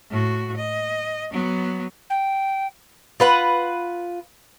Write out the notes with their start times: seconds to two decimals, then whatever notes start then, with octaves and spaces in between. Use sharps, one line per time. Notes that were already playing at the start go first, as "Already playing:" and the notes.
0.10 A2 F#4
0.57 D#5
1.31 F#3 B3
2.09 G5
3.20 F4 B4 F#5